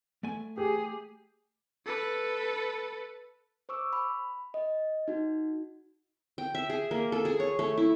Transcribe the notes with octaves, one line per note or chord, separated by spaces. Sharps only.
A3 G#5
G4 G#4
A4 B4
C5 C#6 D6 E6
B5
D#5
D#4 F#4
G5
E5
G#4
A#3
A4
G#4
C#5
A3
E4